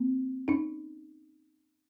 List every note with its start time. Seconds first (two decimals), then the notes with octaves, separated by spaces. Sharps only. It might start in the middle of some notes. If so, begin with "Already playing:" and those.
Already playing: A#3 C4
0.48 C#4 D#4